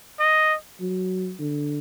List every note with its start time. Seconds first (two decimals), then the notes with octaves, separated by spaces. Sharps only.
0.20 D#5
0.80 F#3
1.39 D3